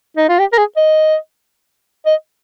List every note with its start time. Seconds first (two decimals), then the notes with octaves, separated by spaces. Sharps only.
0.17 D#4
0.29 F4
0.39 G4
0.53 A#4
0.58 G#4
0.77 D#5
2.06 D#5